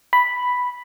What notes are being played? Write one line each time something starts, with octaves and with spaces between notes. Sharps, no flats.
B5